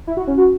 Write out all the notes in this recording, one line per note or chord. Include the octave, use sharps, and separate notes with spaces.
E4
F#4
C#4
F#4